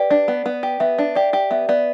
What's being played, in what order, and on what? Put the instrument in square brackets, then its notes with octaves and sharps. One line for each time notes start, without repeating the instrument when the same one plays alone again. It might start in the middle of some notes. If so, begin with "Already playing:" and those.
Already playing: [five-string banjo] G4 [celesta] B4 D5
[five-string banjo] D4 [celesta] D5
[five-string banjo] B3
B3
G4
[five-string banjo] B3 [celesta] E5
[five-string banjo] D4
[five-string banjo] G4 [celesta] D5
[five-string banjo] G4
[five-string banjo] B3 [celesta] E5
[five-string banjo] B3 [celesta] D5